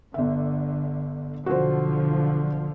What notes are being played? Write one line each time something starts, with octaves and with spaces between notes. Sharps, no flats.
G1 D3 E5
B1 D3 F3 F#4 C5